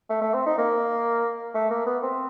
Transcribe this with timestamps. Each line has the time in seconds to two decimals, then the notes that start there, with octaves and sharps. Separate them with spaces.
0.10 A3
0.22 A3
0.34 C4
0.46 D#4
0.58 A#3
1.55 A3
1.71 A#3
1.86 B3
2.03 C4